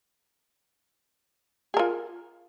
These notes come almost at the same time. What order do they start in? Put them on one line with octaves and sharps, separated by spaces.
G#4 A#4 F4